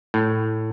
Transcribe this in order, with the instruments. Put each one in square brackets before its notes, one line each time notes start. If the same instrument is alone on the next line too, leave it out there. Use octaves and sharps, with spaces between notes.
[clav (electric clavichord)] A2